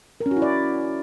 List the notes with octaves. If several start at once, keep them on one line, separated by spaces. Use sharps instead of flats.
A#4
C#4
F#4
E4
D5